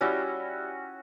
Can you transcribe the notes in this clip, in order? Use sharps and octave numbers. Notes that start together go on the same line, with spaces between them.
G3 C#4 E4 F#4